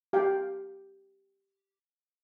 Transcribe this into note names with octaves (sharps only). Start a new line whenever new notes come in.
G4 F5 G5